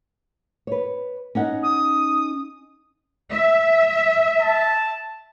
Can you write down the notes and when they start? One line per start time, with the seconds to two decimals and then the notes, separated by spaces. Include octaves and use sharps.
0.67 B4 C#5
1.35 C#4 D#4 F#5
1.62 D#6
3.31 E5
4.42 A5